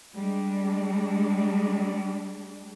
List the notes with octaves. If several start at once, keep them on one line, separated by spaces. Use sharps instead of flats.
G3 G#3 D4